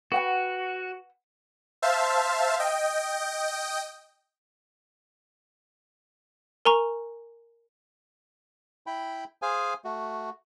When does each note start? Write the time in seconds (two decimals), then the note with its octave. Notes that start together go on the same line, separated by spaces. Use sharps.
0.12 F#4 B4 F#5 G5
1.82 C5 E5 F5 A5
2.59 D#5 G5
6.65 A#4 G#5 A#5 C#6
8.87 E4 G5 B5
9.42 G#4 C5 F5 G#5
9.85 A3 F#4